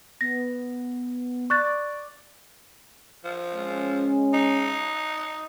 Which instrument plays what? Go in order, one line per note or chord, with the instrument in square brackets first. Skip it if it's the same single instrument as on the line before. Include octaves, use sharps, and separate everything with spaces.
[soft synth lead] B3 [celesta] A#6
[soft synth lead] D5 [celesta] C#6 F#6 A6
[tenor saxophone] F3
[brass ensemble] G#3 C#4
[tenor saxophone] D#4